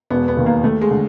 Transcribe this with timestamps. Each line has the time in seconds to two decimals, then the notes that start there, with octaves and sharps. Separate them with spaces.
0.10 E1 B3
0.28 B3
0.37 D#2 D#3
0.46 A#3
0.63 D#2 A3
0.81 G#3
0.91 D3